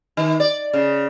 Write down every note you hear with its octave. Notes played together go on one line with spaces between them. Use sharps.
D#3
D5
C#3